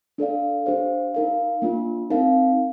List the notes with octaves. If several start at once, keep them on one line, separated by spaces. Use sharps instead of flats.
D4 A4 D5 F5
D4 G4 C5 F5
D#4 A#4 F5
A#3 D4 F4
C4 D#4 A#4 F5